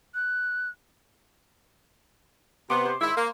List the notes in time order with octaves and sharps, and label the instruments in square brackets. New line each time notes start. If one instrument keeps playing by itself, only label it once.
[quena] F#6
[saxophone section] C3 B3 [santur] C6 D6
[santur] C5
[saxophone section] G#2 D#3 E4
A#3